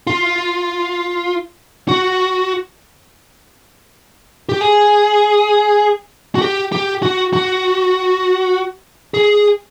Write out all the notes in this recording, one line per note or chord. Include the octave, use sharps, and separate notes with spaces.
F4
F#4
G4
G#4
F#4
G4
G4
F#4
F#4
G#4